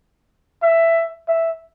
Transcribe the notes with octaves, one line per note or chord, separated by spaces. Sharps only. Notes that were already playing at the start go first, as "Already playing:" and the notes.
E5
E5